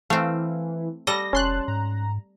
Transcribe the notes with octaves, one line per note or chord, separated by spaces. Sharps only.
E3 A3 C4 F5
G3 A4 D#5 A#6
F1 C#4 A5 C6 F#6
G#2 A#5